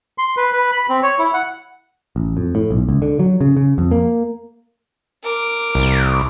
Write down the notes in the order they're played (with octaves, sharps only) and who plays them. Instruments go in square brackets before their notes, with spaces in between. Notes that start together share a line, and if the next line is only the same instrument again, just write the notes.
[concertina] C6
B4
B4
B5
C4
C#5
E4
F#5
[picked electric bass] A1
F2
A2
B1
C#2
D3
F#3
C#3
C#3
F2
A#3
[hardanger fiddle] A#4 D6
[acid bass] C2